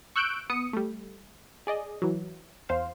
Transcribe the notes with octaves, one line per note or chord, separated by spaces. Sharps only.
C#6 E6 F#6 G6 D7
B3 D#6 C#7
G3 A3
G#4 D5 D#5
E3 F#3
E2 C5 F5